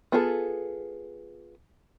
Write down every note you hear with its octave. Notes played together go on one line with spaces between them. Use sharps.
B3 F4 G#4 A4